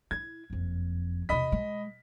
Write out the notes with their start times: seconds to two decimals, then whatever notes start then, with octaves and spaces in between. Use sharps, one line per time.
0.11 E4 G#6
0.50 F#1 F2
1.29 E2 C3 D#5 B5 B6
1.52 G#3